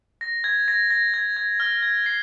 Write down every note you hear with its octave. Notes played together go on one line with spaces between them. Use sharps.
A#6
G#6
A#6
A#6
G#6
G#6
F6
G#6
C7